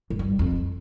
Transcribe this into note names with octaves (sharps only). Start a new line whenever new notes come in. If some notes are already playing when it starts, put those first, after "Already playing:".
G#2
G2
F2